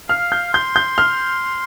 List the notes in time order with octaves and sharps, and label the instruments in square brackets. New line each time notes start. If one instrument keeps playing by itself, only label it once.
[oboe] F5 [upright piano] F6
[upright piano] G6
[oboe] C6 [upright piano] G6
[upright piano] G6
F6